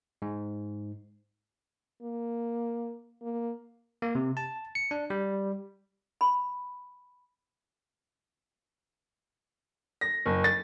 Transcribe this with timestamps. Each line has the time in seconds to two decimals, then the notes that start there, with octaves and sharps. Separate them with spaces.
0.22 G#2
2.02 A#3
3.22 A#3
4.02 A#3
4.15 C3
4.37 A5
4.75 C#7
4.91 D4
5.10 G3
6.21 B5
10.01 A#6
10.26 F#1
10.44 A6